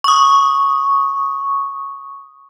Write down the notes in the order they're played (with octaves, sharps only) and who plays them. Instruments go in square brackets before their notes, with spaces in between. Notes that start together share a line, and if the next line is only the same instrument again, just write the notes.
[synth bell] C#6 D#6